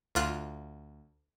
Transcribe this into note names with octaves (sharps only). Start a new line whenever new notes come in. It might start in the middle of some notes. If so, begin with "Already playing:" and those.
D2 F4 F#6